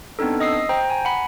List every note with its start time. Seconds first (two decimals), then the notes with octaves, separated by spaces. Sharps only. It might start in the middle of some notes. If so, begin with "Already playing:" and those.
0.19 B3 C4 D4 D#4 A4
0.40 D#5 D#6 E6 C7
0.69 C5 G5 A#5
0.90 G#5 A#5
1.05 F#5 B5